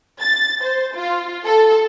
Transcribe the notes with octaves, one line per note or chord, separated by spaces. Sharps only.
A6
C5
F4
A4